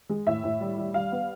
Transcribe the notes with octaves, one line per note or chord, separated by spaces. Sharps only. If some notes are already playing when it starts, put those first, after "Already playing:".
G#3
A2 E5
A2
G3
G3
G3 F5
B3